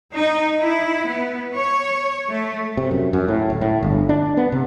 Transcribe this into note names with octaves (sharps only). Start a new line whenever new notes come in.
D#4
E4
B3
C#5
A3
C3
F#2
F#2
A2
D1
A2
G1
D4
B3
C3